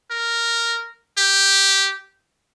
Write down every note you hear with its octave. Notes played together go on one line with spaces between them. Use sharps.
A#4
G4